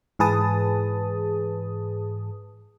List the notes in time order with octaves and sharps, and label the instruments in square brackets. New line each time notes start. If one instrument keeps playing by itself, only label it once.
[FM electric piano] G#2 E3 G#4 B4 A5 D#6